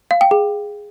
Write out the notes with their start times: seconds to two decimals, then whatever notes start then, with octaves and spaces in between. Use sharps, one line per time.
0.11 F5
0.21 G5
0.31 G#4